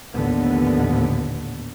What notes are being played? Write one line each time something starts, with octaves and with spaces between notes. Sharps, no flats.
A#1 D#2 A2 D3 B3